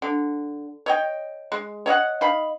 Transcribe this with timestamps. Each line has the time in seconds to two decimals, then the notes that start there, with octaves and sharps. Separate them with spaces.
0.02 D3
0.86 C#5 D#5 G5
1.52 G#3
1.86 C#5 D#5 F5 F#5
2.21 D#4 F5 B5